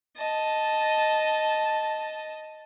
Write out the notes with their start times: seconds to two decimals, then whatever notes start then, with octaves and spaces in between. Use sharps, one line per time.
0.17 D#5 A5